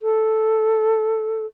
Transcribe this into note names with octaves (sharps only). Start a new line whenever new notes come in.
A4